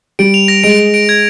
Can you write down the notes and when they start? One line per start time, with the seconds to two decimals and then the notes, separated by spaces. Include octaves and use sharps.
0.19 G3 D7
0.34 F7
0.48 A#6
0.64 G#3 D7
0.79 D7
0.94 D7
1.09 G#6